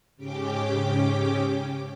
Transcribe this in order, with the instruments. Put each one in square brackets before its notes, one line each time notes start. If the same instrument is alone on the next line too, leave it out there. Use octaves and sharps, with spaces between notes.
[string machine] G#2 C#3 C#4 G4 G5 D6